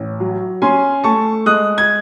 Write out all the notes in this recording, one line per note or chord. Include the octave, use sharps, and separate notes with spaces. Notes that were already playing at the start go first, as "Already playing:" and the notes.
Already playing: A1
F#3
C#4 G#5 C6
A3 A5 C#6
G#3 D#6 F#6
G#6